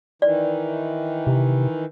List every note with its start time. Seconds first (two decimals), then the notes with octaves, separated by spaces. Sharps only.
0.22 D#3 E3 D5
1.27 C3